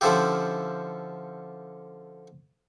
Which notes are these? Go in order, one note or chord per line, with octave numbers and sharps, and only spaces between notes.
D3 F3 C#4 E4 F4 G4